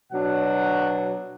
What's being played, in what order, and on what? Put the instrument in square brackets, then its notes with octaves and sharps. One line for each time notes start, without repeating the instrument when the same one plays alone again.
[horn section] B2 F#3 D4 F#5